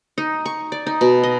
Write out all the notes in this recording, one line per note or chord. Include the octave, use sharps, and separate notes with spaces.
D#4
C#6
D5
D#4
B2
D#5